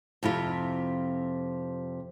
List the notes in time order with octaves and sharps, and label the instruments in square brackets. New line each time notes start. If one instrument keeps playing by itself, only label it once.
[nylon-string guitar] F2 C3 E4 F4